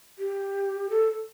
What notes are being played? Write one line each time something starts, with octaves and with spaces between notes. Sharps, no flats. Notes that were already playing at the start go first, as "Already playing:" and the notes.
G4
A4